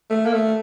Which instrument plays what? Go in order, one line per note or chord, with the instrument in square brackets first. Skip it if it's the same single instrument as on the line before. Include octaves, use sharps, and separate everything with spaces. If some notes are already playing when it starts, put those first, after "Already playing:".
[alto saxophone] A3
A#3
A3